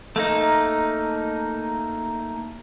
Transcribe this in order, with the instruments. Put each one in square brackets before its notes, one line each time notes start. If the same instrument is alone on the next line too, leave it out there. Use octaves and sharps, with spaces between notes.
[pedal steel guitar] A3 A#3 D#4